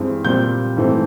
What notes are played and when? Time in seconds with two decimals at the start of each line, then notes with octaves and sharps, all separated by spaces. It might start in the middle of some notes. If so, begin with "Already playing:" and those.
Already playing: G2 E3 G#3 C4
0.25 A#2 G3 C4 G6
0.77 G#2 E3 A3 C4